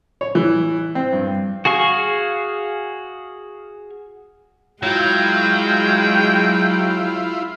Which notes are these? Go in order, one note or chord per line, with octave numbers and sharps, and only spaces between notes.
C#5
E3
C4
G2
F#4 G#4 F5 C#6
F#3 G#3 E4 F4 G5